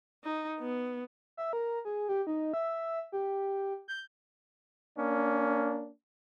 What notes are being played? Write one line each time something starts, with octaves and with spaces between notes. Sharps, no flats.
D#4
B3
E5
A#4
G#4
G4
D#4
E5
G4
G6
A#3 C#4 D4